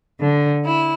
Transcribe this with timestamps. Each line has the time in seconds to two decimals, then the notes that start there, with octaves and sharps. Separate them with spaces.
0.21 D3
0.65 E4